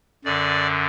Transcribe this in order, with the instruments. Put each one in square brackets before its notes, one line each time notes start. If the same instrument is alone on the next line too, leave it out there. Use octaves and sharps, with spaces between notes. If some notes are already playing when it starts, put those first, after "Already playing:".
[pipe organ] F#2 D3 D5